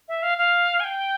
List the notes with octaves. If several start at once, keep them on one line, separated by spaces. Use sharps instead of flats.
E5
F5
F5
G#5
G5